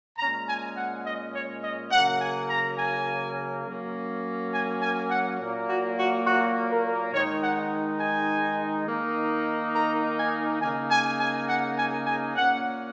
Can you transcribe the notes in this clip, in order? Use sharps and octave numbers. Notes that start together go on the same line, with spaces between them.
A#2 G#3 C#4 A#5
G#5
F#5
D#5
C#5
D#5
C#3 F#3 A#3 F#5
G#5
A#5
G#5
F#3 A#3 C#4
G#5
G#5
F#5
A#2 F#3 A#3
F#4
F#4
F#4
A#4
D#3 G#3 D#4 C#5
F#5
G#5
D#3 A#3 D#4
A#5
G#5
C#3 A#3 D#4 G#5
G#5
G#5
F#5
G#5
G#5
A#2 A#3 C#4 F#5